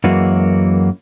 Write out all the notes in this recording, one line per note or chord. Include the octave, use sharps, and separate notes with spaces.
F#2 E3 G#3 A#3 F#4